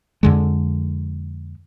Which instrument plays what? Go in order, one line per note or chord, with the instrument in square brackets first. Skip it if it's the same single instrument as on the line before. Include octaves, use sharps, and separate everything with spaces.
[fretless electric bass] F2 D3 G#3